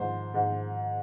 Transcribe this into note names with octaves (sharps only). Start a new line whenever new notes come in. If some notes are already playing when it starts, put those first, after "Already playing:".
Already playing: G#2 F3 C5
G#2